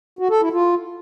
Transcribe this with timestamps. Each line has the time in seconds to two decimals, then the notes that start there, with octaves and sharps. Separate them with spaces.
0.19 F#4
0.30 A4
0.41 E4
0.53 F4